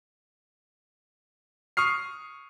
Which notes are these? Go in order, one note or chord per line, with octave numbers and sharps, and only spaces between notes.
C#6 D#6 F6 C7